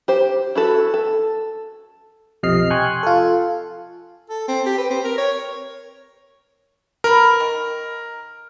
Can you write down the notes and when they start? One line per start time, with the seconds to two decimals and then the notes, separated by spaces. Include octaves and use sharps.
0.08 G4 C5
0.55 E4 F#4 A4
0.94 A4
2.43 B1 F2 C3 D#5 F6 C7
2.70 G5 G#5 C6 C#6 F#6
3.03 F4 A4
4.29 A4
4.48 C4
4.66 G4
4.78 B4
4.90 C4
5.05 A#4
5.18 C#5
7.04 A#4 B4 B5
7.40 D#3